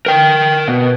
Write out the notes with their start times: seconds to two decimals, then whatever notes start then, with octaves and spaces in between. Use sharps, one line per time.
0.06 A#4 G5
0.68 B2